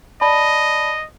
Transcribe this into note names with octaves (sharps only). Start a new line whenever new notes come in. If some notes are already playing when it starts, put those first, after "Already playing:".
D5 D#5 A5 B5